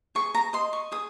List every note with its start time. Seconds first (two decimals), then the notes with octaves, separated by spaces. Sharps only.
0.15 G#4 C#6
0.35 A#5
0.53 D#5 C6
0.73 C#6
0.92 G#4 D#6